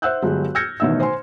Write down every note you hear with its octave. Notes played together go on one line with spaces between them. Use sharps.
C5 E5 F#5 E6 F#6 G6
G1 F#3 G#3 G4
E6 F6 G6 G#6 A#6 C#7
A1 B2 D#3 E5 E6
C5 F#5 G#5 C6